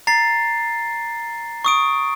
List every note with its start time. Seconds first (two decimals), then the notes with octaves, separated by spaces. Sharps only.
0.07 A#5 A6 C7
1.65 C#6 D#6 D7